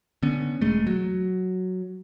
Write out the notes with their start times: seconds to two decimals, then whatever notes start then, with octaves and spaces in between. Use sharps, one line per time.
0.23 D3 B3 C#4
0.61 E1 G#3 A3
0.87 F#3